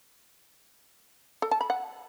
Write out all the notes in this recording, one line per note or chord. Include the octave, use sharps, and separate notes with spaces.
A4
A5
B5
F#5